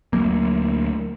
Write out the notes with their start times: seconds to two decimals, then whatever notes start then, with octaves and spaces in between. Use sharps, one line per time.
0.13 D2 F#3 A#3